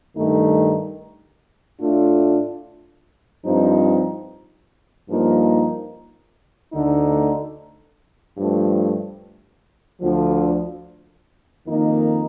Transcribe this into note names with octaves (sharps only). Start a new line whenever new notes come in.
G2 D#3 A3 D#4
A2 A3 D4 F4
G2 F3 C4 D#4
G2 F3 A#3 D#4
D2 D3 A3 D#4
G2 F3 A3
D2 D3 F3
F2 D#3 A#3 D#4